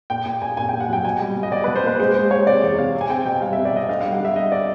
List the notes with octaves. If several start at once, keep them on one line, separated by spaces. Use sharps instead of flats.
A#2 G5
A#2 G5
A#2 G#5
A#2 G#5
A#3 G5
F#5
F#3 G5
B2 G#5
G3
B2
D#5
B2 D5
B2 B4
C5
A#3 B4
G#3 C5
G#3 C5
G#3 C#5
C3 D5
E2
C3 F5
C4
G#5
C4 G5
B2 G5
G3 F5
C4 E5
D5
B2 D#5
D2 F5
G3 F5
F#5
D3 E5
G3 D#5
D5